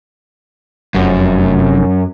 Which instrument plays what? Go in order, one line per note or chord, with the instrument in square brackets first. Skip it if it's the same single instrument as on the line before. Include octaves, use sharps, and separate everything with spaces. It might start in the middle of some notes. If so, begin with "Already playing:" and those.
[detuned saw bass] F1 [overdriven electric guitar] F#2